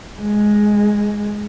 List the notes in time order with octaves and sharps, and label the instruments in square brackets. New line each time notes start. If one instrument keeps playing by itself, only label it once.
[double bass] G#3